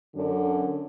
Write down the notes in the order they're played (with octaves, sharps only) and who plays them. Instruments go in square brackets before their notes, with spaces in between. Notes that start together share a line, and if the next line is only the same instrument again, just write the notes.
[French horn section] F#2 D3